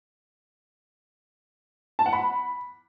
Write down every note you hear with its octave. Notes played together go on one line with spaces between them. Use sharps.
A5
F#5
B5